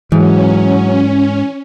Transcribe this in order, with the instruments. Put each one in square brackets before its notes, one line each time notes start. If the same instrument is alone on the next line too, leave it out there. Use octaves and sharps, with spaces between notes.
[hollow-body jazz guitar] G#2 [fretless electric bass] E3 [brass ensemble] F#3 [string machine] C#4